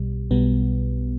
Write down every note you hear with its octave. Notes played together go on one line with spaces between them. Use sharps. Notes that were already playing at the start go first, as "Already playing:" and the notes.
Already playing: B1 B2 G3
B1 B2 G3 B3